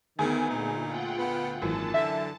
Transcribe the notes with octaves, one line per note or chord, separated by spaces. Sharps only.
D2 D#3 B3 G#4
A#2 D#4
F4 F#5 G5
B3
G#1 F#2 A#2 E3 A5
D3 E5